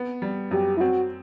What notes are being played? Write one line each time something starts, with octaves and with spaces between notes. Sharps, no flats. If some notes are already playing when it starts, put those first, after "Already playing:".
Already playing: B3
G3
F#2 G4
E4
C4 F#4